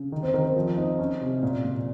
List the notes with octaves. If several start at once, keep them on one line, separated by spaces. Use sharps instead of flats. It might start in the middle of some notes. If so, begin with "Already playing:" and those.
Already playing: C#3
D#3
C4 C5
D#3 A#4
C4 C5
F3
C4 D#4 D#5
C#4
C3
A#2
A#2